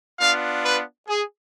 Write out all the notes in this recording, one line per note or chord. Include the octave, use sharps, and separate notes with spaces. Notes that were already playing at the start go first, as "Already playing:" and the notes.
B3 D4 F4 F5
B4
G#4